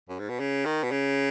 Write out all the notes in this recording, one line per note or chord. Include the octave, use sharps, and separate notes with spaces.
F#2
G#2
B2
C#3
D#3
B2
C#3